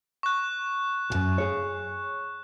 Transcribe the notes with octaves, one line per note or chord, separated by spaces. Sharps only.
C#6 F#6
B1 F#2
G#4 C#5